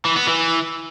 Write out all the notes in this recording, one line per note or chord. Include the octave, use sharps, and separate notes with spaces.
E3
B3
E3